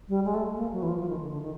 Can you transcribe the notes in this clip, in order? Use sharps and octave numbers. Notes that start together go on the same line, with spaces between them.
G3
G#3
A3
A#3
F#3
E3
F3
F3
D#3
D3
D3
D#3